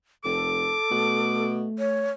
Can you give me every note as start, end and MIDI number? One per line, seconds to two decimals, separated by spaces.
0.25 0.76 29
0.25 1.46 69
0.25 1.55 86
0.91 1.66 47
0.91 2.14 57
1.79 2.12 73